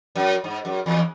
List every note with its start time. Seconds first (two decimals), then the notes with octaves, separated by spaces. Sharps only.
0.16 F#2
0.44 G#2
0.65 F#2
0.86 E2